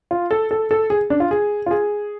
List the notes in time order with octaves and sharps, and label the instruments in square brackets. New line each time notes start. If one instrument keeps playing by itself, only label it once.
[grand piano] F4
A4
A4
A4
G#4
D4
F4
G#4
F4
G#4